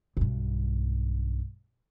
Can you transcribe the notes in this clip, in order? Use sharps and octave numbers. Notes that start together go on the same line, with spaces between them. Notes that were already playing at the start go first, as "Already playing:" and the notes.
B1 G2